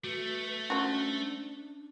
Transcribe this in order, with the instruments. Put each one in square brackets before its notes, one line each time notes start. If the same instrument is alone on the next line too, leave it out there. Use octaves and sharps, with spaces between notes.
[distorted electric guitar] A3 [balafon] F#4 [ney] B4
[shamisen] F3 F#4 [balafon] C#4 [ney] D4